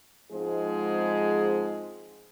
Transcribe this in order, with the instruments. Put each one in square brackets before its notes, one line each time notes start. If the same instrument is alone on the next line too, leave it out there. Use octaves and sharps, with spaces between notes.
[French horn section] G#2 F3 G#3 C4 G#4